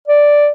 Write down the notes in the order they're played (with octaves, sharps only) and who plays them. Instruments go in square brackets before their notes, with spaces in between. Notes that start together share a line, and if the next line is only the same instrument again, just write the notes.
[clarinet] D5